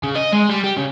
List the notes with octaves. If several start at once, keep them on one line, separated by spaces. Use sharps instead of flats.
C#3
D#5
G#3
G3
G4
C#3